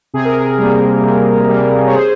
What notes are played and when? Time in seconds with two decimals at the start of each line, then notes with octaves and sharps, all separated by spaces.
0.14 C3 G#4
0.25 A#4
0.35 G#4
0.58 G3 A#3
1.04 C3
1.49 G3 A#3
1.86 C#5
1.94 G#4 C5